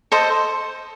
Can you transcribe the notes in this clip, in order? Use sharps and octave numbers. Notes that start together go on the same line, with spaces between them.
A4 C5 D#5